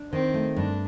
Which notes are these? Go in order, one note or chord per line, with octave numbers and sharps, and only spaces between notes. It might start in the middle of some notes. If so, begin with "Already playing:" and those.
Already playing: D4
D#3 C4
A3
G2 D4